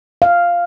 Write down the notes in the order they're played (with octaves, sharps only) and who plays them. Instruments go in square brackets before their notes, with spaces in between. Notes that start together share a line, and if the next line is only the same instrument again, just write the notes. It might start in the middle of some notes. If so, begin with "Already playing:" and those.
[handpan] F5